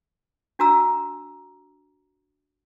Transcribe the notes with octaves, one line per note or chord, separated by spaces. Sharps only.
D4 F#4 A#5 E6